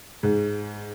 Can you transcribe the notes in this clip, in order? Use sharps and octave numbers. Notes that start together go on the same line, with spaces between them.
G#2